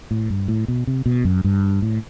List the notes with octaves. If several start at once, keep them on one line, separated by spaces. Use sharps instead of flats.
A2
G2
A2
B2
C3
B2
F#2
G2
A2